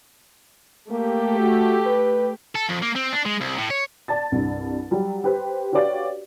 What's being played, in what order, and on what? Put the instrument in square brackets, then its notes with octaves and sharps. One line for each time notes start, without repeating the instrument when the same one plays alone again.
[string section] A3 G4 [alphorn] A#3
[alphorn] F#4
B4
[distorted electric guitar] A4
F2
A#3
C4
D4
G#3
C2
A2
C#5
[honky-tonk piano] D5 A5 A6
C2 G2
F#3 G3
G4 B4 C5
F#4 G4 B4 C#5 D5 F5